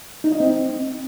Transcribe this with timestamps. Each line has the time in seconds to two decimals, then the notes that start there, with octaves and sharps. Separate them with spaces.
0.24 D#4
0.32 D#5
0.40 C4